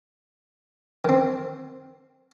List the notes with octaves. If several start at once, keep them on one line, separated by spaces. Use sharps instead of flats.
D#3 C4